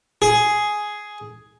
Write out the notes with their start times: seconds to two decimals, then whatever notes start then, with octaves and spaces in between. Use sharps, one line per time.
0.22 G#4